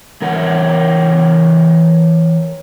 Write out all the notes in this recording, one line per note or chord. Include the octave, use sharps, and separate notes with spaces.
E3 A#4 C#5 F#5